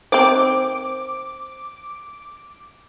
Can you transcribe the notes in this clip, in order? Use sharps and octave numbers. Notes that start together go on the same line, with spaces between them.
D#3 C4 C5 D6